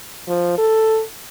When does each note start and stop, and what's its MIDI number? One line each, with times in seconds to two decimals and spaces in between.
0.28 0.56 53
0.58 1.02 69